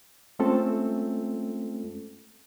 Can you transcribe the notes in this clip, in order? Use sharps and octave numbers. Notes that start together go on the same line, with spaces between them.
G#3 A3 C4 C#4 F4 A4